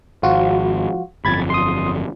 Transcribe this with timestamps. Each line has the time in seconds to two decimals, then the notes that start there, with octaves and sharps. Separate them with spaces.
0.23 G#1 F3 F4 F#4
1.25 G1 F2 B5 G#6 A6
1.50 C6 D#6